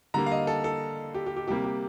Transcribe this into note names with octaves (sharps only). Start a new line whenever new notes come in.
D3 G3 A#3 A#5
F5
D#5
A4
A4
G4
G4
G4
C3 G3 A#3 G4
G4